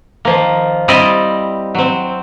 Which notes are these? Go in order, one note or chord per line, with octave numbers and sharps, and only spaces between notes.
D#3 F3 A#3
G3 C4 E4 D5 D#5
F#3 C4